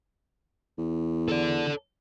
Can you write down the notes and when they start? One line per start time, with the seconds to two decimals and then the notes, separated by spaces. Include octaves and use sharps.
0.78 E2
1.29 A4 D5